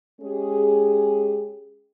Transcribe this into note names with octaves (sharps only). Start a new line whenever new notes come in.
G#3 C#4 G4 G#4